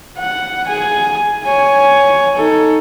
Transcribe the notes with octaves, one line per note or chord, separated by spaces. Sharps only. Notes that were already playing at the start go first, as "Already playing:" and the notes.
F#5
G#4 G#5
C#5 G#5
D#4 A4